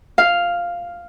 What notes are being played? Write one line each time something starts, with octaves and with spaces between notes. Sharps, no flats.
F5